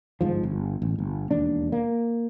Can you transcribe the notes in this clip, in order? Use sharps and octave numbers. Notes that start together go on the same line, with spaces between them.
G1 G#2 F3
G1
A1
G1
E1 D#2 D4
A#3